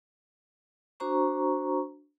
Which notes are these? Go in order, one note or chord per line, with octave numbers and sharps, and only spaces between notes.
D4 F#4 C5 A#5 C#6